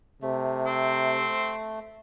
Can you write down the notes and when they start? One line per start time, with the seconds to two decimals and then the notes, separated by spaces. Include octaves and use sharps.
0.22 C3 A3
0.66 C4